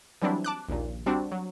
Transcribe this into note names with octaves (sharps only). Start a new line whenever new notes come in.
E3 F#3 G3 C4 D4 E4
A5 D6 F#6
A#1 D#2 A#2
G3 C4 D4 F#4
F#3